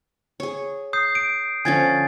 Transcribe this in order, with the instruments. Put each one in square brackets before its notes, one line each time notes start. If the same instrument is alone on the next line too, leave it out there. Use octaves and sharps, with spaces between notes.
[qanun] G#4 C#5
[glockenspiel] D#6 G6 C7
D7
[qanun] D3 F3 C#4 [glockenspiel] G#5 G#6 A6